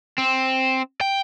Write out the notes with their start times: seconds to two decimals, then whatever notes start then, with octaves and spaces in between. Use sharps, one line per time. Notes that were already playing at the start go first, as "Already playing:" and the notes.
0.18 C4
1.01 G5